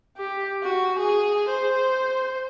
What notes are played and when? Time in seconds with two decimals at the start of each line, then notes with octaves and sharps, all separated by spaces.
0.17 G4
0.63 F#4
0.98 G#4
1.49 C5